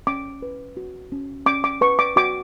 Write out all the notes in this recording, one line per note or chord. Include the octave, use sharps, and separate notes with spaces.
C#4 D6
B4
F#4
C#4
C#4 D6
D6
B4 C#6
D6
F#4 D6